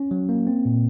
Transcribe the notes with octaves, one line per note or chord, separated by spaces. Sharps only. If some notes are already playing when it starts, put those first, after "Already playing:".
Already playing: C#4
F#3
A#3
C4
A#2